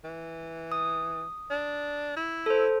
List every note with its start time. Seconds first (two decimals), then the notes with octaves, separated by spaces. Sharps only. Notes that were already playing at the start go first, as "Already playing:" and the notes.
0.04 E3
0.72 D#6
1.50 D4
2.16 E4
2.46 A4 C5